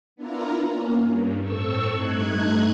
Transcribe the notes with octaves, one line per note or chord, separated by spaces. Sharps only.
B3 D4 E4 F4 A#4 A#5
A#3 C#4
G2
A2 C4 A4 C#6 E6
G2 A3 D#4 F#6 G#6